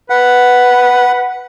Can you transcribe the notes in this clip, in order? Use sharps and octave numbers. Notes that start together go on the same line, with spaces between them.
B4 F#5